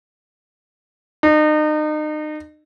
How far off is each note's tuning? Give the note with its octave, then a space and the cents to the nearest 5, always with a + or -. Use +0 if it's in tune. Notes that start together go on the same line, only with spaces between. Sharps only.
D#4 -35